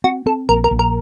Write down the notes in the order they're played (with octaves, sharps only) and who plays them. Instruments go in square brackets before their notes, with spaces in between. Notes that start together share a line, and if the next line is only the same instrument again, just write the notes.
[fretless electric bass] C4 [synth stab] F#4
[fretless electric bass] C4 [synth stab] A4
[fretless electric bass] A#1 [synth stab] A#4
[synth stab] A#4
[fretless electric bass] A#1
[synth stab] A#4